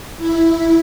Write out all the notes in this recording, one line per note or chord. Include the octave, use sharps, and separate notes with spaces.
E4